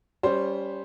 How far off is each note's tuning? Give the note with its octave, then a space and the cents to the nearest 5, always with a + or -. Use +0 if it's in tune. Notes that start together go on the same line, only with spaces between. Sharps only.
G3 +0 C#4 +20 C5 +0